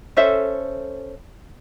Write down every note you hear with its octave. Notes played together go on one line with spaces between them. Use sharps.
C#4 A4 C5 E5